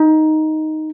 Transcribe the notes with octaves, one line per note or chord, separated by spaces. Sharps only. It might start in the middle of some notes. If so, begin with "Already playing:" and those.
Already playing: D#4